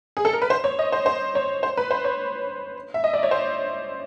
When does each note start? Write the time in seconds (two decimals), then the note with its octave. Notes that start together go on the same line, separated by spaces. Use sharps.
0.17 G#4
0.25 A4
0.33 A#4
0.42 B4
0.50 C5
0.64 C#5
0.79 D#5
0.92 C5
1.06 C5
1.35 C#5
1.63 C5
1.77 B4
1.91 C5
2.04 C#5
2.94 E5
3.04 D#5
3.14 D5
3.23 C#5
3.31 C5